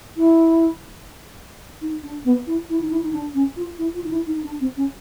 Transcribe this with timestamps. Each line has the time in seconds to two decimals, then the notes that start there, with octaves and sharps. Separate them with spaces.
0.17 E4
1.81 D#4
2.03 D4
2.25 B3
2.47 E4
2.69 E4
2.81 D#4
2.90 E4
3.03 D#4
3.13 D4
3.34 C#4
3.56 F4
3.78 E4
3.94 F4
4.04 D#4
4.11 E4
4.27 D#4
4.44 D4
4.60 C4
4.77 C#4